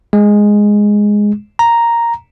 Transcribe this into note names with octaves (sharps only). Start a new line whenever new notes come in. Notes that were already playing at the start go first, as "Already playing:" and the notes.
G#3
A#5